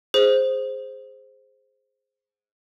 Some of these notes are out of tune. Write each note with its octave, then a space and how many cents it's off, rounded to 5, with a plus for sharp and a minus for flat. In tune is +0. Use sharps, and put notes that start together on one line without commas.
G#4 +0 C5 +0